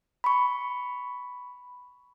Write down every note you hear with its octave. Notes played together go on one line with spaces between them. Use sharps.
B5 C#6